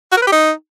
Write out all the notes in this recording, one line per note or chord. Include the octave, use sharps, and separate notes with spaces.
F#4
A#4
B4
G4
D#4